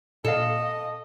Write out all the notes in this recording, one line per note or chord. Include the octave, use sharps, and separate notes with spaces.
A#2 A4 D#5 F5